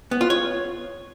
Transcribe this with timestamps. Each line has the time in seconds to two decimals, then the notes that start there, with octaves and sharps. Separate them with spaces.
0.11 B3
0.21 F4
0.30 C#5